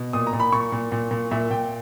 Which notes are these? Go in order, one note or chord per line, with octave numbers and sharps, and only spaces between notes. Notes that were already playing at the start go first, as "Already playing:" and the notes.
Already playing: B2
A#2 D#6
A#5
A#2
B5
A#2 C#6
A#2
A#2
A#2
A#2 E5
A#2 G5